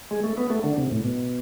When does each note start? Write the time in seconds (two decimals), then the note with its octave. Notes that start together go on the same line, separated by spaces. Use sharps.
0.11 G#3
0.24 A3
0.38 B3
0.50 A3
0.64 D3
0.78 C3
0.91 A2
1.04 B2